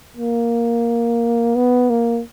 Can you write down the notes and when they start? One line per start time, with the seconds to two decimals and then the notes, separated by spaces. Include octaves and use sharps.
0.17 A#3
1.56 B3
1.90 A#3